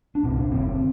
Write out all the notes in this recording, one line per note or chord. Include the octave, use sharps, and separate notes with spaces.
D4
C2 A#2 C4
D4
F#1 F#2 D3 C4
C4